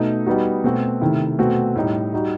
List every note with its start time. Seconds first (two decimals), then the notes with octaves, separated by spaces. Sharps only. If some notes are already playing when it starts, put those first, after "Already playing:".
Already playing: B2 A3 D#4
0.26 G3 B3 D#4 F#4
0.64 B2 A3 C4 F#4
1.01 C3 D#3 A3 E4
1.39 B2 A3 C4 F#4
1.76 A2 G3 D#4
2.13 G3 D#4 F#4